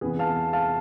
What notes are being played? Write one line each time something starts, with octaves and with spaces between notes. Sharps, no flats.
E2 C3 E3 G#4 B4
F5 A5
F5 A5